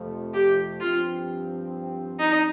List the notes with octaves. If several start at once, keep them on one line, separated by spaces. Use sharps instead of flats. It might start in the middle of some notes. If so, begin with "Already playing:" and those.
Already playing: F2 C3 F3 A3
G4
G2 F3 C4 F4 G4
D#4